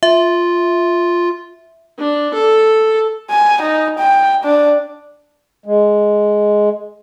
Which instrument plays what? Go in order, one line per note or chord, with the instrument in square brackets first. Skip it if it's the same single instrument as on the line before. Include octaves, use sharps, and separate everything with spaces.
[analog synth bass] F4 [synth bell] E5
[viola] D4
A4
[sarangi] G#5
D#4
G5
D4
[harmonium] G#3